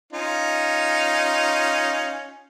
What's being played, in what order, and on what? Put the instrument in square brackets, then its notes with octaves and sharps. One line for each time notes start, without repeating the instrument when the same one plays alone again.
[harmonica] C#4 D#4 F4